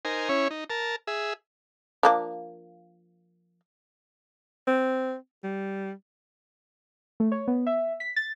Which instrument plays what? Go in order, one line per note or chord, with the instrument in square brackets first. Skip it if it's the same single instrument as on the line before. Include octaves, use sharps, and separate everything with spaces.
[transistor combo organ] D#4 A#4 C5 G#5
C#4 E4 C#5
D#4
A#4 A5
G#4 E5
[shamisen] F3 A#3 D4
[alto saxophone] C4
G3
[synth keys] A3
C#5
B3
E5
B6
A6